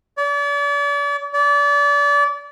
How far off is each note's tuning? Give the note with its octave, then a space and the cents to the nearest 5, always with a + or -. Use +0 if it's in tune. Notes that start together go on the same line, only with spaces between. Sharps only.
D5 -40
D5 -30